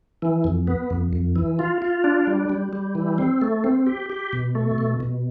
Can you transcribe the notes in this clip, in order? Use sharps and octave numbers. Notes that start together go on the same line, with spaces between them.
E3
F2
B3
F2
F2
E3
F4
F4
D4
G3
G3
G3
E3
C4
A3
C4
G4
G4
B2
A3
B2
B2